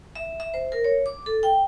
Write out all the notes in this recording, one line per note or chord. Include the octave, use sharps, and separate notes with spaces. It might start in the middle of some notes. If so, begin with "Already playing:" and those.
E5
E5
C5
A#4
C#5
D6
A4
G5